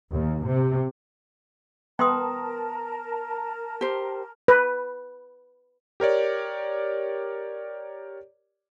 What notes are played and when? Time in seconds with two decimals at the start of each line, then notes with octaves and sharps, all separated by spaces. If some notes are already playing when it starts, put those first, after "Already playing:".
0.13 D#2
0.48 C3
1.99 B3 A#4 G5 A5 A#5 C6 D#6
3.81 G4 C5
4.48 B4
6.00 G4 A#4 C#5 D5